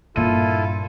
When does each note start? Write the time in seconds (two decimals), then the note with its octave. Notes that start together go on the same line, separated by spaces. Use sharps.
0.16 G2 A#2 E4 F4 A4 D#7